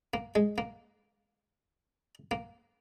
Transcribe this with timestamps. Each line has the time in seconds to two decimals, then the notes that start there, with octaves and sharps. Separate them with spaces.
0.14 A#3
0.35 G#3
0.58 A#3
2.31 A#3